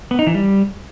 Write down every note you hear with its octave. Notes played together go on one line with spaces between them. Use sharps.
B3
D#4
E3
G3